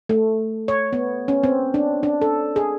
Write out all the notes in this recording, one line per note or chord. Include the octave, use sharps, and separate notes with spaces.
A3
C#5
B3
C#4
C4
D4
D4
A4
G#4